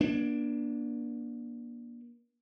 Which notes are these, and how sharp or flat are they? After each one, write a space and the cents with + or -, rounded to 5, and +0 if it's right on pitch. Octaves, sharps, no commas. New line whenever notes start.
A#3 +40 D4 +0